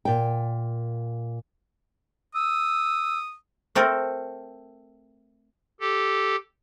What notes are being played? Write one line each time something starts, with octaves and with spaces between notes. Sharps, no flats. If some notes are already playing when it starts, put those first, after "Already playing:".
A#2 G5
D#6 E6
A3 C4 A4 A#4
G4 A4